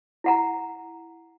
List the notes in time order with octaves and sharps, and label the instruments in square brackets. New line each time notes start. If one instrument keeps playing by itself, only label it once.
[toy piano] E4 F#5 A#5